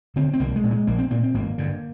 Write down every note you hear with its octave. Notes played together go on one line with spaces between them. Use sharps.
D3 C4
C4
C2 A#3
G#3
A#2
G#3
A#1 A#3
C4
A#2 A#3
C4
G#1 A#3
G2 D3